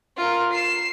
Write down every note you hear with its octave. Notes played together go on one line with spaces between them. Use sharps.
F4 A#4
C7 E7